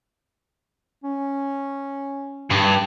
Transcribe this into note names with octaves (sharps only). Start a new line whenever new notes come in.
C#4
G2